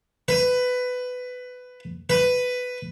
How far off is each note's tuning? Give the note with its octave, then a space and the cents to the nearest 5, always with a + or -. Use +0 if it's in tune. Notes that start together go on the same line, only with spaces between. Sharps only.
B4 +15
B4 +10